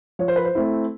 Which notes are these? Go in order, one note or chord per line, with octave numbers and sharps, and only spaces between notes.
F3 C#5
C5
B4
C5
A3 C4 E4